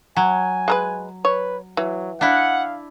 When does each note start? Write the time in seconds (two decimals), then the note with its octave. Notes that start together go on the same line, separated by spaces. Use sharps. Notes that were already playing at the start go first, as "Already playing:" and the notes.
0.16 F#3 G#5
0.68 G#3 A#4 B4
1.25 B4 C#5
1.77 E3 F#3
2.21 D4 E4 F5 F#5